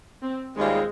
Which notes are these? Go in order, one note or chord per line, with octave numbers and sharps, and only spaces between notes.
C4
D#2 D#3 G3 G#3 C4 F4